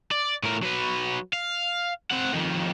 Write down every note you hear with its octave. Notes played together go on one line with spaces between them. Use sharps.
D5
A2 A#4
F#3 B4
F5
C4 F#5
F2 D#3